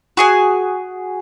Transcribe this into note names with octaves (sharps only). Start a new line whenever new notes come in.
F#4 G#4 G#5